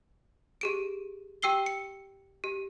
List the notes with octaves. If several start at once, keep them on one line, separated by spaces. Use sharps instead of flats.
G4 G#4 D7
G4 G5 E6 C7 G7
C#7
G4